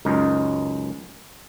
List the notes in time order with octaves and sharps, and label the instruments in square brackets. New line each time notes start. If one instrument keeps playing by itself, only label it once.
[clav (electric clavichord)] C#2 F#2 D#4 D#5